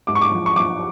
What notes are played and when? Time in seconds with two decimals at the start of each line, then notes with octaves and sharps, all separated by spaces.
0.07 G#2 D6
0.15 C#6
0.21 D6
0.32 F3
0.46 C#6
0.56 F3 D6